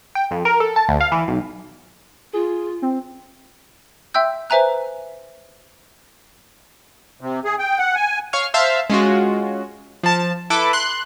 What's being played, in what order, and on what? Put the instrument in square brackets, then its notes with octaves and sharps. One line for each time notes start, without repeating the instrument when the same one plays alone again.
[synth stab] G5
F2
A#4
A4
A5
D2
F5
E3
B1
[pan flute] F4 [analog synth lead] G#4
[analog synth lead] C4
[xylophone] E5 G5 C6 E6 G6
B4 C5 E5 G#5 A#5 F#6
[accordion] C3
G#4
G5
F#5
G#5
[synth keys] C#5 F5 C#6 F6
C5 E5 F5 A5
G#3 C#4 F4 F#4
F3 A5
E4 A4 B4 D6
C6 F#6